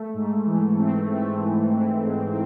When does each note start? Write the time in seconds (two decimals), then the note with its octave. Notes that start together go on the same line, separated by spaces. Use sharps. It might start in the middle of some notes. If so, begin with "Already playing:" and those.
Already playing: A3
0.14 G#2
0.46 E3
0.77 C4
1.10 A3
1.41 G#2
1.73 E3
2.05 G#2